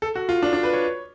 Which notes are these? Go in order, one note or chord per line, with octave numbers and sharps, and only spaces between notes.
A4
F#4
F4
D4
D4
B4
C#5